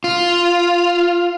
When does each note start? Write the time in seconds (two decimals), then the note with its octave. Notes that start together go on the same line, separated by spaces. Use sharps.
0.04 F4